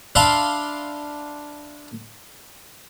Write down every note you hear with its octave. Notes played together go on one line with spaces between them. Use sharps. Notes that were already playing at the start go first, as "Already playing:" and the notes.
D4 E5 F5 B5 C6